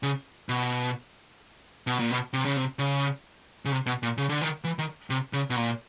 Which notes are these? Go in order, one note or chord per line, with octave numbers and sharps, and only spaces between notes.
C#3
B2
B2
A#2
B2
C3
C#3
C3
C#3
C#3
C3
B2
A#2
C#3
D3
D#3
E3
D#3
C3
C#3
B2
A#2